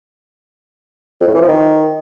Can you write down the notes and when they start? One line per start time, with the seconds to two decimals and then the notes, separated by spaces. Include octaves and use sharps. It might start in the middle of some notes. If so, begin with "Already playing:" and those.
1.21 F2
1.27 A2
1.34 E3
1.41 F3
1.48 D#3